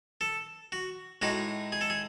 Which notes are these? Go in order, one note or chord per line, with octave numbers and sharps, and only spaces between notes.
A4
F#4
A2 G#3 D#4 F#4
G#4
A4
G#4